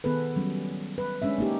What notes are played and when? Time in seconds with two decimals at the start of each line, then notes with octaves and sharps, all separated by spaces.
0.04 D#3 B3 G#4 A4 B4
0.36 F#3 G3 C#4
0.98 B4
1.22 G#3 C#4 D4 E5
1.39 A#3 D#4 G4